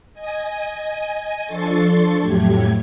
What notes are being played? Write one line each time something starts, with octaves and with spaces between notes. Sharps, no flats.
D#5 G#5 D#6
F3 D4 A4 C6 C#6 A6
F2 A2 F#3 A3 G4 G#6